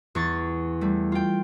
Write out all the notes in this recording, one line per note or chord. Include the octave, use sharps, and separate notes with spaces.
E2 C#6 A6
G3 A3
F4 G5